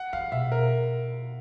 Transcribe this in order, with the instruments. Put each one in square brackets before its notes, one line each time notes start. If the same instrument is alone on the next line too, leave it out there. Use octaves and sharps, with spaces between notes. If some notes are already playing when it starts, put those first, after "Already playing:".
Already playing: [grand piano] F#5
[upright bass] E3 [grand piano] F5
[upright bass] B2 [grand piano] E5
[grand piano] A#4